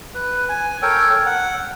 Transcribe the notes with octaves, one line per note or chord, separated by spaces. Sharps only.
B4
G#5
A4 A#4 C#5 G5
F#5